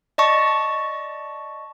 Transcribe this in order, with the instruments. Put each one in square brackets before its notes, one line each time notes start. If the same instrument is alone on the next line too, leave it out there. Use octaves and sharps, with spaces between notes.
[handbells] D5 D#5 A5 C#6